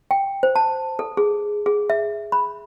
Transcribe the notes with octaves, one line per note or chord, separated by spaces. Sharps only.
G5
C5
A5
A4
G#4
G#4
E5
B5